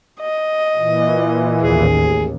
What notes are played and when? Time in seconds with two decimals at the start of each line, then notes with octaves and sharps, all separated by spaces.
0.21 D#5
0.77 A#2 E3
1.61 A1 D#2 G#4